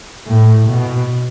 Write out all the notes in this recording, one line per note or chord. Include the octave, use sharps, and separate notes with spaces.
A2
B2